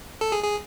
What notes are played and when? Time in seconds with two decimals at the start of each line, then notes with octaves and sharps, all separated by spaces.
0.21 A4
0.32 G#4
0.44 G#4